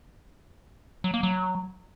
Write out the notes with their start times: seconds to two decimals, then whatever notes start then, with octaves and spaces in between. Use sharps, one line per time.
1.04 F#3
1.14 A#3
1.23 F#3